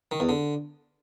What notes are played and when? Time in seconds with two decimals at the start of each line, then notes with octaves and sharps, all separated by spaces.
0.11 D#3
0.20 E2
0.29 D3